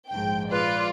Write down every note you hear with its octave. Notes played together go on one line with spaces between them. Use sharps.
A#1 G#2 F3 G5
F4 B4 D5